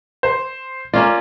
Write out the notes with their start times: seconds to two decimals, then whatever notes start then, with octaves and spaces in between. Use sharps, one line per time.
0.23 C5
0.94 A#3 C#4 F4 D5